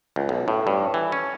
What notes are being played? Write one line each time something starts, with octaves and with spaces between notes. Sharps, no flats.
C#2
B1
A2
G2
E3
C#4